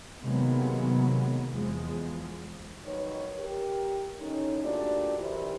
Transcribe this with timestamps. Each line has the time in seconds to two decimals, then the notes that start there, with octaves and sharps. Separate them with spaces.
0.22 C3 D#3 F#3 G#3 A#3 B3
1.53 E2 F3 G#3
2.85 D#2 D#3 F#3 B4 C#5
3.39 G4 A#4
4.19 A2 D#3 C#4 D#4
4.62 A#2 A3 D4 F#4 G4 D5
5.18 E3 D#4 E4 G4 A#4 C5